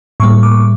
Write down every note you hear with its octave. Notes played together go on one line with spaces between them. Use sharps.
A2 G3 A#3 C#6
D6